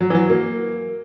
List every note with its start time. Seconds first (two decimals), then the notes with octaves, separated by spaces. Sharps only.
0.01 F#3
0.10 E3
0.15 F#3
0.29 A#3